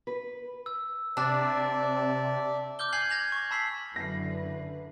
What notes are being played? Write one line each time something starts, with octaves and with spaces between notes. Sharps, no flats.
B4
E6
C3 D4 D5 E5 A5
D6 F6 G6 G7
G#5 F6 G6 G#6 C7 F#7
G6 G#6 A#6 F7 F#7
C#6
A5 B5 E6 B6 C7 F#7
F#1 F#2 D3 E4 B4 A#6 C7